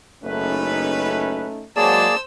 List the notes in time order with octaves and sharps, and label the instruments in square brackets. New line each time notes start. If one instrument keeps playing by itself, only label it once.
[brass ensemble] F#1 B4 [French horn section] A3 C#4 D#4
[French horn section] F#3 G#3 [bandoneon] A#3 G#4 D5 [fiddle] C5 E6 [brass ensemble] A5